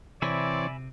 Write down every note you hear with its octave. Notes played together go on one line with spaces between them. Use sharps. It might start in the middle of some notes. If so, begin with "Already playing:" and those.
C3 E3 C4 C#5 D5 E5 G#5 B5